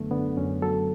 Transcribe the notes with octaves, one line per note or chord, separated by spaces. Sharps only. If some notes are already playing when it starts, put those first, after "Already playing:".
Already playing: F#2 D3 F#3 A3 B3
D3 B3
F#2 C#4
F#3 A4